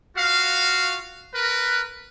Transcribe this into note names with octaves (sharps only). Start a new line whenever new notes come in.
F4 F#4 F5
A#4 B4